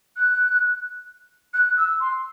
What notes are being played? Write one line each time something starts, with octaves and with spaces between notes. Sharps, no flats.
F#6
F#6
E6
C6